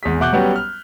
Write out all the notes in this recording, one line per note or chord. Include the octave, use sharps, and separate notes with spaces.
G#1 E2 G#4 B6
B2 E5 F#5 D6 F#6 G6
F#3 G3 B3 C#4 F#4 G4
F6